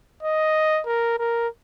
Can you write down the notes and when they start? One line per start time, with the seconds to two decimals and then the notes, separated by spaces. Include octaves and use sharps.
0.23 D#5
0.87 A#4
1.19 A#4